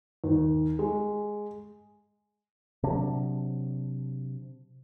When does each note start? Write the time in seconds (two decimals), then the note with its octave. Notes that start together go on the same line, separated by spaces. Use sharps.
0.24 D#2
0.79 G#3
2.83 C3 F#3 D4